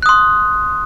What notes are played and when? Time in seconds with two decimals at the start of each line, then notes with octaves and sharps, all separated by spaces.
0.02 F#6
0.06 D#6
0.09 C6